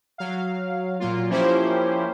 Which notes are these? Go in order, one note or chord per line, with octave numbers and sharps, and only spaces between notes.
F#3 F5
A#2 F#3 A#3 F4
F3 A#3 C#4 E4 G4 C5